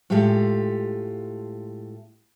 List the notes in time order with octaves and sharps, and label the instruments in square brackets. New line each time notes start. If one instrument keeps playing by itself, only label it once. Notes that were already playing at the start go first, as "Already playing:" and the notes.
[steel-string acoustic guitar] A2 G#3 F4 G4 A4